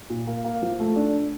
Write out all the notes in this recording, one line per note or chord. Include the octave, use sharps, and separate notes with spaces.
A#2
A#3
A#3
F3
A3
D4